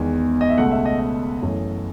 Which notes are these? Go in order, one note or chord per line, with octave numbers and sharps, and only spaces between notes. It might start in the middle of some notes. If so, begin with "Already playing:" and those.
Already playing: E2 D#3 G#3 G#5
D#5
E5
C#2 B2 A3 F#5
E5
D#5
D#5
F#2 E3 A3